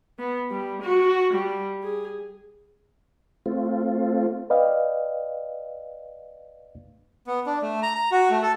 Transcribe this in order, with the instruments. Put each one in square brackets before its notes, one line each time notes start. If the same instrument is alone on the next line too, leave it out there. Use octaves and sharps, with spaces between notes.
[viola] B3
G3
F#4
G3
G#4
[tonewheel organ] A3 C4 F4
[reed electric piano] B4 D5 D#5 F5 G5
[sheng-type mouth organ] B3
D4
A3
A#5
A#5
F#4
A3
A4